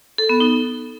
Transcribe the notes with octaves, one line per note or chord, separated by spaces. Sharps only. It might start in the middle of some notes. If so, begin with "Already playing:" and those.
A4
B3
D#4